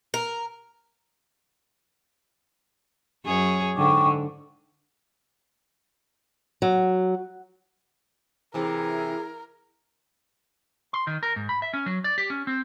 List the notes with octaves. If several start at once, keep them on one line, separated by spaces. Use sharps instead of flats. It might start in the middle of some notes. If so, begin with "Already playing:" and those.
A#4
F#2 G#4 C#5
G#2 D3 D4 G5 C#6 D6
F#3
C3 E3 E4 G#4 A#4
C6
D#3
A#4
G#2
B5
E5
C#4
F#3
D5
G4
C#4
C4